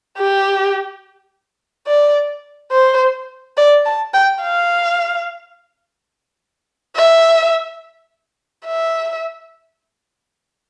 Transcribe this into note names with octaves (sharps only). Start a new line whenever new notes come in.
G4
D5
C5
D5
A5
G5
F5
E5
E5